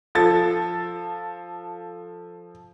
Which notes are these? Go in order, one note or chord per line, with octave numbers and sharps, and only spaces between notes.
F3 A4 A6